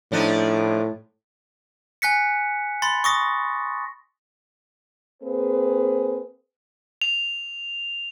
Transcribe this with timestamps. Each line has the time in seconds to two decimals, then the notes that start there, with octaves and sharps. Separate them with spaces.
0.12 A2 F3 D4 D#4
2.02 G#5 F#6 B6 C#7
2.82 B5 C6 A6
3.04 C#6 D#6 A#6
5.22 A#3 C4 G#4 B4 C5
7.02 F7